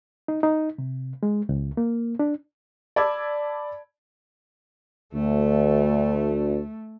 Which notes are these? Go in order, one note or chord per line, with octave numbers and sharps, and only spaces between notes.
D#4
D#4
C3
G#3
C#2
A#3
D4
D5 A5 B5 D6 E6 G#6
D2 A3